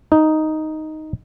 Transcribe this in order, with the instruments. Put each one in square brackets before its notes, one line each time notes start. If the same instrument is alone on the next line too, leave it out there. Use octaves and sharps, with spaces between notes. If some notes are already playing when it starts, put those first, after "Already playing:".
[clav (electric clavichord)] D#4